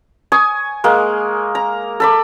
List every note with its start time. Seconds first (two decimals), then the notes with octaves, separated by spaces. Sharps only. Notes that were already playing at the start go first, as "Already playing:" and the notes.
0.32 G#5 C#6 D#6
0.84 G#3 A#3
1.55 A#5
2.00 A4 B5 D6